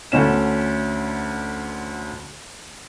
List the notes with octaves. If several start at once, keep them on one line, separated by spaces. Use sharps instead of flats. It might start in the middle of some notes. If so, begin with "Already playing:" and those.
D2 D3 C#4 E7